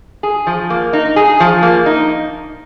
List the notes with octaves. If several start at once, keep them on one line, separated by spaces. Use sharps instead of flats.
G#4
F3
A#3
D#4
G#4
F3
A#3
D#4